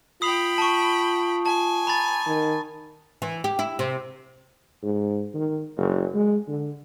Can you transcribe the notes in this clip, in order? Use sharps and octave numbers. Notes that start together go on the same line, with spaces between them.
F4 G5 B5 D#6 C7 F7
A5 C#6
G#5 A5
A#5 B5 A6
D#3
E3
G4
E4
C3
G#2
D#3
F#1
G#3
D3